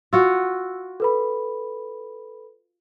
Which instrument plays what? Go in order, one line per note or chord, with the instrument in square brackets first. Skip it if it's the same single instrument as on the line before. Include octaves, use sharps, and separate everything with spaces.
[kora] F4 F#4 [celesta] E6
[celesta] A4 B4 B5